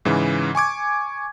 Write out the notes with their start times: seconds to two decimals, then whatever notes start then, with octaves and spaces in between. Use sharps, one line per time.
0.05 G#2 C#3 E3
0.55 G#5 C#6 D6 G#6